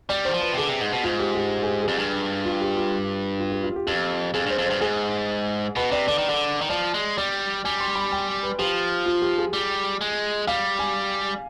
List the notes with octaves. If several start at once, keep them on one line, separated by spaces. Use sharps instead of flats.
G3 D5
D#3 C5
F3
B4
C3
D3 G#4
C3
G#2
B2
G#2 F4
G4
G4
G#4
G4
F2 G#4
G2
F4
G4
F4
F4
G4
F4
G4
F2 G4
F2 G#4
G2 C5
F2
G2 C5
G#2 G#4
B2 B4
C3 D5
D3 D5
D#3
D3
D#3
F3 D5
G#3
G3 D5
G3 G#5
C6
B5
G5
B4
F3 G4
F4
G4
G#4
G3
G#3
G3 F5
G#5